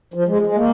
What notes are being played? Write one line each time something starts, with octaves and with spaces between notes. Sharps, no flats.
F3
G#3
G#3
A#3